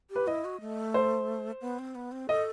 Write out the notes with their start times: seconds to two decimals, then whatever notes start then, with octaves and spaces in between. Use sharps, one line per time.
0.10 G4
0.15 B4
0.27 E4 D#5
0.44 F#4
0.61 A3
0.94 C5
1.61 B3
1.79 C4
1.95 B3
2.12 C4
2.29 A4 D#5